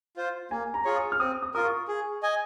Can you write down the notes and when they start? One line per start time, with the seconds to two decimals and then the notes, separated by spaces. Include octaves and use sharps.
0.17 F4 C5
0.51 A#3 G#5
0.74 A#5
0.85 F4 G#4 C#5
0.96 D#6
1.12 F6
1.20 C4 D#6
1.42 D#6
1.54 F4 A#4 D#6
1.65 C#6
1.88 G#4
2.23 D#5 G#5